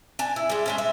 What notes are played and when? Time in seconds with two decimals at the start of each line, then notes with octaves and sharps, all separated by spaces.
0.19 D4 G#5
0.36 E4
0.49 G3 G#3
0.66 G#3 A3 C#4
0.78 E5